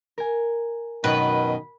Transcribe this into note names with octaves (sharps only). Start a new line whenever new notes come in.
A#4 G#5
F#2 B2 D#3 B4